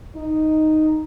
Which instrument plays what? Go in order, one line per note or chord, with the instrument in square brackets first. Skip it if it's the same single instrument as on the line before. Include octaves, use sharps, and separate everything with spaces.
[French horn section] D#4